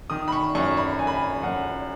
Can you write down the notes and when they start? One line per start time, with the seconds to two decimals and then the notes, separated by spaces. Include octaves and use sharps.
0.10 D#3 D#6
0.28 B5
0.32 C#6
0.55 F#2 C#6
0.77 B5
0.98 F#2 G#5
1.07 B5
1.14 G#5
1.43 F#2 F#5